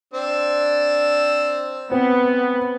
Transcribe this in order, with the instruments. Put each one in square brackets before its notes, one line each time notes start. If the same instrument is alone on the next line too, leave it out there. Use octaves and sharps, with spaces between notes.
[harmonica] C4 D4 E6
[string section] B3 [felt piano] C4